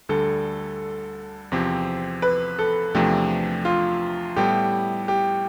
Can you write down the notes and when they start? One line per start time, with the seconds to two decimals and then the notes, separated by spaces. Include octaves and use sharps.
0.09 D2 D3 G3 A4
1.52 E2 C3 F3 C4 G4
2.22 B4
2.59 A4
2.95 E2 C3 F3 A3 D4 G4
3.65 F4
4.36 A2 G3 B3 E4 G4 A4
5.08 G4